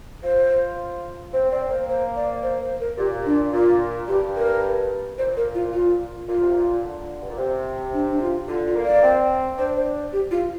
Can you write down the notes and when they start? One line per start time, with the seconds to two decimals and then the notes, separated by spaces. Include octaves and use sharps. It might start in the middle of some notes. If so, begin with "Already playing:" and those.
0.23 F4 C5
1.33 C4 C5
1.51 C4 D5
1.70 A#3 C5
1.89 C5
2.16 D5
2.43 C5
2.61 C5
2.80 A#4
2.98 A#2 G4
3.26 D4
3.53 A#2 F4
4.08 G2 G4
4.36 A#4
5.18 A#2 C5
5.37 A#4
5.55 F4
5.74 F4
6.28 A#2 F4
6.41 C3
6.53 A#2
6.83 D3
7.21 G2
7.30 A#2
7.38 C3
7.93 D4
8.11 D4
8.21 F4
8.48 D3 F4
8.67 F4
8.76 A#3
8.85 D5
9.03 C4
9.58 D4 C5
9.76 C5
10.13 G4
10.31 F4